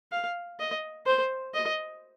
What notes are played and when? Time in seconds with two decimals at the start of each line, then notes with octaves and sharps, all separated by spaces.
0.12 F5
0.59 D#5
1.06 C5
1.54 D#5